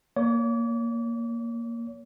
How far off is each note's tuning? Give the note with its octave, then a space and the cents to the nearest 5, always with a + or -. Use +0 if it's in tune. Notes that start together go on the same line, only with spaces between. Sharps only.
A#3 +0 C#5 +25 D6 -35